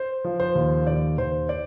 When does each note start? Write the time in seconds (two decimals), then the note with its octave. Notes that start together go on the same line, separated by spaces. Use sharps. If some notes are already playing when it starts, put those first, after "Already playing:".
Already playing: C5
0.24 F3
0.40 C5
0.55 D#2
0.87 D#2 D5
1.18 D#2 C5
1.49 D5